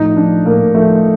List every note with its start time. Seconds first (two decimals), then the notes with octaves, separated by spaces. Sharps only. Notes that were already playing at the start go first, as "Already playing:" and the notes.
Already playing: A2 F3 D#4
0.16 F3 D4
0.45 A2 A#3
0.74 F3 A3